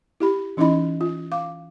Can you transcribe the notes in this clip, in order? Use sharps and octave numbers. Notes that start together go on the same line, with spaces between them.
E4 G4 B5
E3 C#4 D#4 E4 D#5 B5
F4
F5 D6